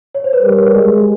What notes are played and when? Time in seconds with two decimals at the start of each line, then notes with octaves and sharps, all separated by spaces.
0.15 C#5
0.24 C5
0.33 B4
0.42 G3 A#4
0.75 G#3